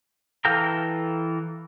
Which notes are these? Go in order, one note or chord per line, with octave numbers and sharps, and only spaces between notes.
E3 A4 F5 G5 A#5